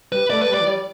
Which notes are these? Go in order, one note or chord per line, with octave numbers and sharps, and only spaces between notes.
G3 B4
A3 D5
B4
G3
D5
E3
G3